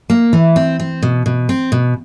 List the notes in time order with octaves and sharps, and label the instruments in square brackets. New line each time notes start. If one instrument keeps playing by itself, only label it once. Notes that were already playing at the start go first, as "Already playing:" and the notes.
[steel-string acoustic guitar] A#3
E3
C4
C4
B2
B2
C4
B2